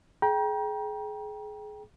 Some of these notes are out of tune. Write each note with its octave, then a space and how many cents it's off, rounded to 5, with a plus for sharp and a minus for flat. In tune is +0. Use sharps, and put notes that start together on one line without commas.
G#4 +30 G5 +0 A#5 +35